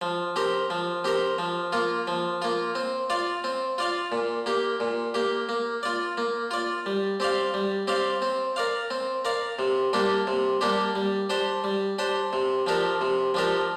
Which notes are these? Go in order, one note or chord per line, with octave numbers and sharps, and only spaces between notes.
F3
C4 G4 A#4
F3
C4 G4 A#4
F3
A#3 F4
F3
A#3 F4
C4
F4 D5 F5
C4
F4 D5 F5
A#2
A#3 G4
A#2
A#3 G4
A#3
F4 D5
A#3
F4 D5
G3
C4 G4 D5 F5
G3
C4 G4 D5 F5
C4
A#4 D5 F5
C4
A#4 D5 F5
C3
G3 A#3 D4 G4
C3
G3 A#3 D4 G4
G3
D4 G4 C5
G3
D4 G4 C5
C3
F3 D4 G4 A#4
C3
F3 D4 G4 A#4